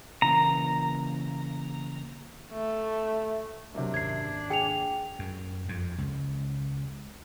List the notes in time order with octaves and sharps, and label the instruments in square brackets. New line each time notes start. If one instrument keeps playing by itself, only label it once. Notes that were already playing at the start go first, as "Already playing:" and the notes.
[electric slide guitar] C#3 E3 A#3 [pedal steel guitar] A#5
[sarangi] A3
[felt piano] F#2 C3 [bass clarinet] D4
[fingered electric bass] G#1 D#2 [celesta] G#6 C7
[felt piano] G#4 C#7 [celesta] G5 F7
[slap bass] F#2
F2
C#2